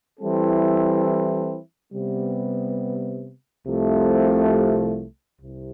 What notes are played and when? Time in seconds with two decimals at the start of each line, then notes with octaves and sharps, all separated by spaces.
0.20 E3 G3 C4 E4 A4
1.93 C3 G3 B3
3.67 C2 C3 F3 A3
5.40 C2 C3